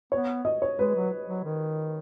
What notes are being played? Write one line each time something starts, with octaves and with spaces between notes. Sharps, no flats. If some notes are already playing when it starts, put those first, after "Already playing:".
B3 C#5
D#5
C#5
G#3 B4
F#3
F#3
D#3